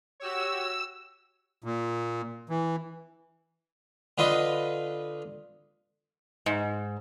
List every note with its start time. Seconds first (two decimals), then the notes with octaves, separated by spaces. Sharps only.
0.20 F#4 G4 C#5 E6
1.64 A#2
2.49 E3
4.18 D3 F4 B4 D#5
6.46 G#2